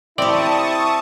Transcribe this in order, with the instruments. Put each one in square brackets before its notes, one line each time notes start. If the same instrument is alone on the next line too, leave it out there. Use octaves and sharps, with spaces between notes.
[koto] C4 G4 [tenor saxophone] E4 [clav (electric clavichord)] D5 [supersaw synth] A5 C#6 D#6